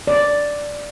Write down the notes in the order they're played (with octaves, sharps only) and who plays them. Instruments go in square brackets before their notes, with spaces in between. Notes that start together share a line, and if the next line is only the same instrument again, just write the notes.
[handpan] D5